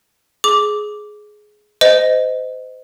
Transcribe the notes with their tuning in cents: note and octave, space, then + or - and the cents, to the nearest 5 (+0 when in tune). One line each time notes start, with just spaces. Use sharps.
G#4 +15 D6 -5
C5 -30 D#5 +0